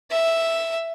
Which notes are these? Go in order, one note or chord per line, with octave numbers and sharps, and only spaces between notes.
E5